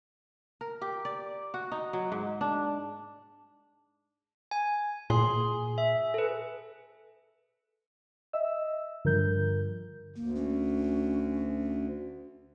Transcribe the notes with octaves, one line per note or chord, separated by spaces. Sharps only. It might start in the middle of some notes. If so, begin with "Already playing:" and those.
A#4
G4
D5
F#4
D#4
F#3
G#2
D4
G#5
A#2 G#4 C6
E5
A4 B4
D#5 E5 E6
G2 D3 F3 A#4 G6
D2 A#3
C#4